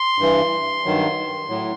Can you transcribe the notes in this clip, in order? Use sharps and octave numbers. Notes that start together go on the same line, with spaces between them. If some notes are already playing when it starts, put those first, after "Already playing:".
Already playing: C6
G2 E3
G2 D#3 F#3
A2 F#3